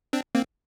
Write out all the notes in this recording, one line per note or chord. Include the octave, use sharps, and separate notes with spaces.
C4 D4
A#3 C4